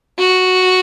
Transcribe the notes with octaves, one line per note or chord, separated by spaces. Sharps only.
F#4